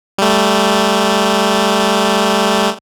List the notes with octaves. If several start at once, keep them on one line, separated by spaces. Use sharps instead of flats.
G3 A3